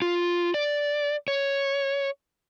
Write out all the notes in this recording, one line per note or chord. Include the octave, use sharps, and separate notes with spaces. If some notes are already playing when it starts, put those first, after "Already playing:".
F4
D5
C#5